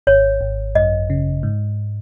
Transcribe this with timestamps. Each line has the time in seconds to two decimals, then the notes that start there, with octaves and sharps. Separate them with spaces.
0.07 G#1 C#5
0.41 G#1
0.75 F#2 D#5
1.10 C#3
1.43 G#2